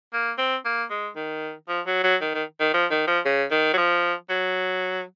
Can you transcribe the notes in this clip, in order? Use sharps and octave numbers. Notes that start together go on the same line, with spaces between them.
A#3
C4
A#3
G#3
D#3
F3
F#3
F#3
D#3
D#3
D#3
F3
D#3
F3
C#3
D#3
F#3
F3
F#3